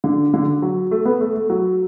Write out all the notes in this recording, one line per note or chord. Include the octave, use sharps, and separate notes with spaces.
D3
D3
F#3
A3
B3
A3
A3
F#3